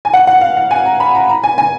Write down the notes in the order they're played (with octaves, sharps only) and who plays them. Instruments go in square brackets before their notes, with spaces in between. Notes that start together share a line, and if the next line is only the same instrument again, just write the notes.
[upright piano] G#5
F#5
F#5
F5
F5
G#5
A#5
B5
A#5
A#5
G#5
G#5